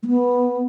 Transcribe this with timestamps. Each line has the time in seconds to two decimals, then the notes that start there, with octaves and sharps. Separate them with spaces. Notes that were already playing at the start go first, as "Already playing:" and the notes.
0.03 A3
0.07 B3